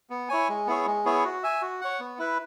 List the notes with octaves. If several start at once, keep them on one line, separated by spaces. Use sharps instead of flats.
B3
E4 C#5 G#5
G#3
B3 E4 G#4 C#5
G#3
B3 E4 G#4 C#5
F#4
E5 G#5
F#4
C#5 F#5
B3
E4 B4